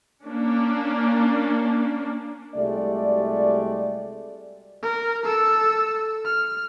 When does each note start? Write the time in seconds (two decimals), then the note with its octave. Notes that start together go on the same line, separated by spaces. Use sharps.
0.24 A#3 C#4 D4
2.55 C2 G#3 A3 F#4 G4 D5
4.83 A#4
5.25 A4 E6
6.25 F6